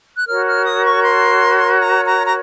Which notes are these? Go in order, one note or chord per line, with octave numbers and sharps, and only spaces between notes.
F#6
F#4 A#4 C#5 F6
F6
D#6
C#6
C6
A#5
A#5
A#5